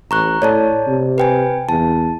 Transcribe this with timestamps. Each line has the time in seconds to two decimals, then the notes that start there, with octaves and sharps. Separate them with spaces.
0.11 A1 A#5 C#6 F#6
0.42 A2 C#5 D5 A5
0.88 C3
1.18 B4 G5 G#5
1.69 E2 A5